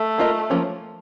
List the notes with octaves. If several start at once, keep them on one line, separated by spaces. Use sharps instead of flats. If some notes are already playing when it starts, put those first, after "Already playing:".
Already playing: A3
A#3 F4 A#4 D#5
F3 A#3 C#4